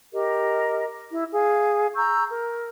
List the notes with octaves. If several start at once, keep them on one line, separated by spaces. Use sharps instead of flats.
G4 A#4 D#5
E4
G#4 F5
A#5 C#6 E6 G6
A#4